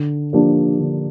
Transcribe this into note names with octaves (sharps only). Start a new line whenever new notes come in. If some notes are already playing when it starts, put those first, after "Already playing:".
Already playing: D3
F3 A#3 D4 G4
D3